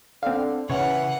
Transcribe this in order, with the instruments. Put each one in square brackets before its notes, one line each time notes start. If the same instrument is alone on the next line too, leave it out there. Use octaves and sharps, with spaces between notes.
[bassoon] D3 [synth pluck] C4 F5
[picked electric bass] C#3 [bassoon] E3 [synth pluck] C#5 F6 [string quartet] F#5